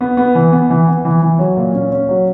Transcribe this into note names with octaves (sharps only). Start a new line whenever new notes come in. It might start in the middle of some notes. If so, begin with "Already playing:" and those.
B3
B3
E3
B3
E3
B3
E3
E3
F#3
A#2
C#4
C#4
F#3